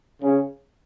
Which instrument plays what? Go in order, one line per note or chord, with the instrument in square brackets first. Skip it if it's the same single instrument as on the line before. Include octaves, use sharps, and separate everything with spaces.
[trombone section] C#3